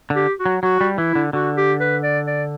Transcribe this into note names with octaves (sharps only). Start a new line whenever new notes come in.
D3
G4
F#4
F#3
F#3 F#4
G3
E3 E4
D3
D3 F#4
G4
B4
D5
D5